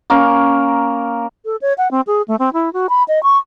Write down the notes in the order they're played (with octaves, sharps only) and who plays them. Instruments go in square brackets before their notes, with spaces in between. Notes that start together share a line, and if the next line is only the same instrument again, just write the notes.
[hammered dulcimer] A#3 C#4 A#4
[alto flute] A4
C#5
F#5
C4
G#4
A3
C4
E4
F#4
B5
D#5
C#6